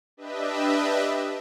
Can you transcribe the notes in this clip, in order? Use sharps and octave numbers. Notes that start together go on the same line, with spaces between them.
D4 G4 B4 D#5 E5